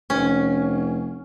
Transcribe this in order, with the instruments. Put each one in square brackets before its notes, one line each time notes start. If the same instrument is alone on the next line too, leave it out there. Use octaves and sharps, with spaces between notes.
[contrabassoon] F1 [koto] C#4